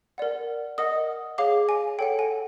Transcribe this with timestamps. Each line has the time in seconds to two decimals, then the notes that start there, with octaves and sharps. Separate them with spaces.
0.18 A#4 D5 F#5
0.78 A#4 D#5 F#5 D#6
1.38 G#4 C#5 F5 D6
1.69 G#5
1.99 A4 C#5 F#5 G5
2.19 G#5